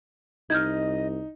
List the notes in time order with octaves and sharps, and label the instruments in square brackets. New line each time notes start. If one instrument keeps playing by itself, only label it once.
[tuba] C2 [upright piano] D#4 [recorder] D#5 [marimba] F6 G6 G#6